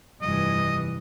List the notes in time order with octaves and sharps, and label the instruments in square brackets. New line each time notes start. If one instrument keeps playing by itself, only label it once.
[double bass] F1 E3 [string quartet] G2 [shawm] D#5